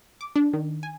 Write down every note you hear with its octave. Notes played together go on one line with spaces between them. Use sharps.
D6
D4
D#3
G#5